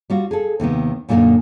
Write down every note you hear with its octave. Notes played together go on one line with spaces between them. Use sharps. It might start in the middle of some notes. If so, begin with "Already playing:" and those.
G3 F4 F#4
G#4 A4
D#2 C3 D#3 B3
F#2 A#2 D3 G3 A#3 D#4